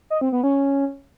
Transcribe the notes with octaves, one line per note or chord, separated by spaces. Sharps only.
D#5
C4
B3
C#4